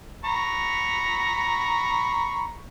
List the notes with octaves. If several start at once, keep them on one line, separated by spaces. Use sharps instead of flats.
A#5 B5 C#6